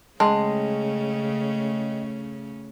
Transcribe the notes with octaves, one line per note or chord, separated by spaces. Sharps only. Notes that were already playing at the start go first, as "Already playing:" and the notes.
C#3 G#3 A3 C#4 G#4 D#5 G5 A5